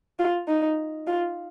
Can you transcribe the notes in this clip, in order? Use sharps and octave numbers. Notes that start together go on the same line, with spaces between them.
F4
D#4
F4